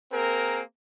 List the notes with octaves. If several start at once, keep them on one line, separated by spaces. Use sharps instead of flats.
A#3 C4 G#4 A#4